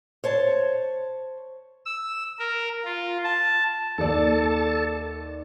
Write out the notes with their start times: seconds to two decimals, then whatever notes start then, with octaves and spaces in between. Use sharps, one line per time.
0.24 C5 C#5 A5
1.86 E6
2.39 A#4
2.85 F4
3.24 A5
3.98 D#2 A4 D5 A5